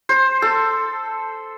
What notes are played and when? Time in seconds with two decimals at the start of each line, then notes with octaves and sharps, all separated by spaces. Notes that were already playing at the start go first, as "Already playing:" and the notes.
0.09 C5
0.42 A4